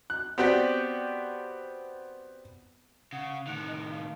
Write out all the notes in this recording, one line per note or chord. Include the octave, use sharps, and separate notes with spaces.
F#6
B3 C4 F#4 G4 B4 D5
C#3 F#5
A2 D#3 F#6
D#5
F5